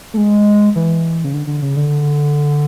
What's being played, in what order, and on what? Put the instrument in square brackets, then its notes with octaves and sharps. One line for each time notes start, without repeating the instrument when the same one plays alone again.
[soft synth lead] A3
G#3
E3
C#3
D3
D3
C#3
D3